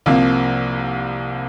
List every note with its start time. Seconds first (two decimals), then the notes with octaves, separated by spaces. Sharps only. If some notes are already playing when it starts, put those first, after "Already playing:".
0.06 C2 C3 F3 A#3